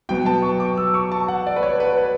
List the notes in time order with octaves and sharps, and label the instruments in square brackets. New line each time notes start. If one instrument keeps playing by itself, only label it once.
[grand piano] B2 F#3 B3 G5
A5
C#6
D6
E6
C#6
A5
F#5
D5
B4
C#5
B4
B4